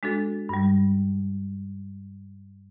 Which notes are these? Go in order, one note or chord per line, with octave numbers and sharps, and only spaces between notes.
G#3 D4 F#4 A4
G2 G3